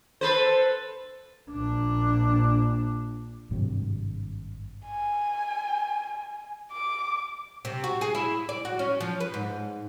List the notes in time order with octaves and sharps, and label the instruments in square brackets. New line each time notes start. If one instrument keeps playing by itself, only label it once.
[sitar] A4 B4 C5
[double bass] A#1 D4
[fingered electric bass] G#1 G2 C3
[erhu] G#5
D6
[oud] C3
F#4
G#4
E4
D5
F#4
C#4
F3
B4
G#2